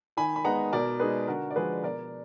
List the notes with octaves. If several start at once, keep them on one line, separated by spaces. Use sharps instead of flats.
D#3 G#5 B5
B5
G#3 B3 D#4 F#5 A#5
B2 A#4 D5
G#3 D#4 G#4 B4
D3 F#4 A#4
D5
F3 G#3 G#4 B4
B2 A#4 D5